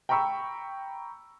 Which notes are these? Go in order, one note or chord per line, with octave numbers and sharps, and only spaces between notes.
G5 A#5 B5 C#6 E6